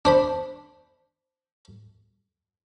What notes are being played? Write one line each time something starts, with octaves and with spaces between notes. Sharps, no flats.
D4 C5 B5